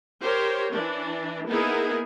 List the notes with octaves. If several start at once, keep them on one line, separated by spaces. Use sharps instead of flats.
G4 A#4 C5 C#5
E3 D4
A#3 B3 D#4 E4 G#4 A#4